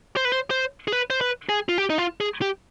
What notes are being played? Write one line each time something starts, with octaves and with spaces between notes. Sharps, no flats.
C5
B4
C5
C5
G#4
B4
C5
B4
G#4
F4
G4
D#4
F4
G#4
G4